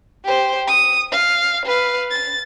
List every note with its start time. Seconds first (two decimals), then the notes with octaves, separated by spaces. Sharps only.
0.24 G4 C5
0.67 D#6
1.11 F5
1.65 B4 F5
2.11 A6